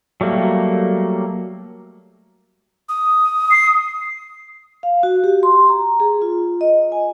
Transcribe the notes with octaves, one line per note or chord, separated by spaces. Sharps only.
F#3 G3 A3 A#3
D#6
C7
F5
F#4
G4
C6
A#5
G#4
F4
D#5
G#5